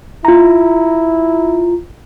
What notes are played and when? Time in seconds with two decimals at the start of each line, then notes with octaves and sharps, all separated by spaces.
0.25 E4 F4 A#5